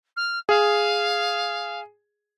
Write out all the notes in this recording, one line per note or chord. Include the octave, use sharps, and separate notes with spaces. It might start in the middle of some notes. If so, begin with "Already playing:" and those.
F6
G#4 F5